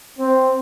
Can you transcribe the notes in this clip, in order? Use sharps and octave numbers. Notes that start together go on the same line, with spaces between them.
C4